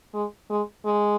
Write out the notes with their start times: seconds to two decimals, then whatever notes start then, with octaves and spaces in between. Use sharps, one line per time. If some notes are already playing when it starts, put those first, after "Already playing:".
0.14 G#3
0.50 G#3
0.85 G#3